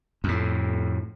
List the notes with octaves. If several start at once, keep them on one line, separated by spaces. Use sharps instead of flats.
F2 A2